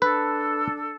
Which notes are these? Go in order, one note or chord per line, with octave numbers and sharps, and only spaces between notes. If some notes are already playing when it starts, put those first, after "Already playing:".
D4 A4 B4